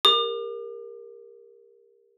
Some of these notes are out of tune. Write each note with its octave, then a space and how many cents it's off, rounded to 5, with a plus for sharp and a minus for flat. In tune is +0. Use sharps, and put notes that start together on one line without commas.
G4 +40 A#4 +0 D6 +35